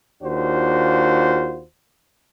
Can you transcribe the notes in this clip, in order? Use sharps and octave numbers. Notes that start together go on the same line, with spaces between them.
D#2 D4 F4 F#4 C5